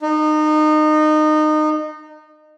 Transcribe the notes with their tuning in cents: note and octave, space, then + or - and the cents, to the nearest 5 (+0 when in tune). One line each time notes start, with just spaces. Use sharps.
D#4 -25